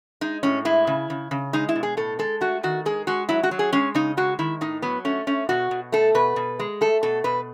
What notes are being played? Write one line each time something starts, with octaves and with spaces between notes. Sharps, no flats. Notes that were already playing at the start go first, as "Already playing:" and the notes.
G#3 D#4
A2 C#4
G#3 E4
C#3
C#3
C#3
G#3 D#4
E4
B2
G#4
A2 A4
G#3 A4
A3 F#4
D#3 F#4
G#3 G#4
G#3 F#4
F#3 E4
F#4
F#3
G#4
G#3 C#4
C#3 D#4
G#3 F#4
D#3 E4
A2 D#4
F#3 B3
A3 C#4
A3 C#4
B2 F#4
B2
A3 A4
B2 B4
B2
G#3
A3 A4
B2 A4
B2 B4